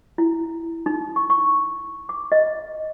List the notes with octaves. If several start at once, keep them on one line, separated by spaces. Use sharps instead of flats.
E4
D#4
C#6
C#6
D6
D#5